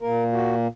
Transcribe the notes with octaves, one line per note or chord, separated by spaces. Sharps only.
A#2 A#3 A#4
F#4